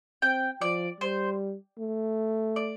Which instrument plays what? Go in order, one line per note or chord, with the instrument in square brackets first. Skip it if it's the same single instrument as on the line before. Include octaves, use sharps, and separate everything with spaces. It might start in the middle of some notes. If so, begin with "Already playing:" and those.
[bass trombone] C4 [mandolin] G5
[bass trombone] F3 [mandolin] D5
[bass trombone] G3 [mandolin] C5
[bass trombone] A3
[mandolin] D5